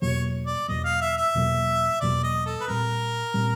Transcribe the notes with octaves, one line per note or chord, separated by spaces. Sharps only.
E2 B2 F#3 A#3 C#5
D5
E2 B2 F#3 A#3 D#5
F5
E5
E5
E2 B2 F#3 A#3
E2 B2 F#3 A#3 D5
D#5
A4
B4
A#2 G3 C4 A#4
A#2 G3 C4